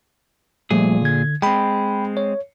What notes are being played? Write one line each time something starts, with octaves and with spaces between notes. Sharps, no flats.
A#2 F3 G3 A3 G#4
D3 G#6
G#3 C4 G5 B5
C#5